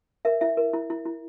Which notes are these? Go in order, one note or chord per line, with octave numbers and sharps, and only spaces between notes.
A#4 E5
E4 E5
A#4
E4
E4
E4